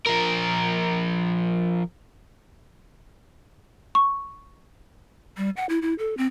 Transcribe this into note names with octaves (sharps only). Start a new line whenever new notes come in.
F3 A#4
C#6
G3
F#5
E4
E4
A4
C4